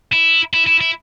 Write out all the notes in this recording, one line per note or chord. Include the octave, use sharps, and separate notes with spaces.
E4
E4
E4
E4